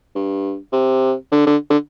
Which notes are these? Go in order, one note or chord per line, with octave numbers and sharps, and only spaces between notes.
G2
C3
D3
D3
D3